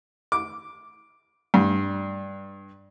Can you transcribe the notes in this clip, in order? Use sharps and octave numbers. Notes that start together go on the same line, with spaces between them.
D6
G2